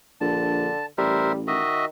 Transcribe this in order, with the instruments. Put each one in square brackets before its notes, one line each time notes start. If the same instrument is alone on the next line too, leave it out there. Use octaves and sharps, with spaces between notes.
[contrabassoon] A#1 [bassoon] D3 [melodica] A5
[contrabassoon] A1 [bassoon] G3 [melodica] A#4 C5 E5
[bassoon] D#3 [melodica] F#4 D#5 E5